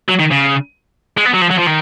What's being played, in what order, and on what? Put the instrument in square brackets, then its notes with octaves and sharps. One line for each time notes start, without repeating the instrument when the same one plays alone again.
[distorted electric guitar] F#3
D#3
C#3
G#3
B3
F#3
F3
F#3
F3
D#3